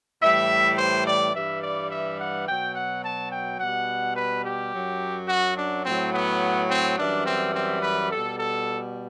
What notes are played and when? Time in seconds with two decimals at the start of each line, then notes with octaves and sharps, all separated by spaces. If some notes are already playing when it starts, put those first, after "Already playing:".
0.22 A2 E3 G3 E5
0.78 C5
1.07 D5
1.34 G2 E3 G3 E5
1.62 D5
1.91 E5
2.19 F#5
2.47 B2 F#3 G5
2.75 F#5
3.04 A5
3.32 G5
3.60 B2 G3 F#5
4.16 B4
4.44 G4
4.73 F#2 F#3
5.28 F#4
5.58 D4
5.86 A2 F#3 C4
6.14 B3
6.70 C4
6.98 F#2 E3 G3 D4
7.27 C4
7.55 C4
7.83 B4
8.11 B2 G3 A4
8.39 A4